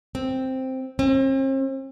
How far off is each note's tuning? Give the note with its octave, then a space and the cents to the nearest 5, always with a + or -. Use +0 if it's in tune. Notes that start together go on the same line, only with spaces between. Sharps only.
C4 +0
C4 +45